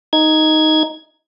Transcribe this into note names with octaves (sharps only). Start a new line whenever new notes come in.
D#4 G#6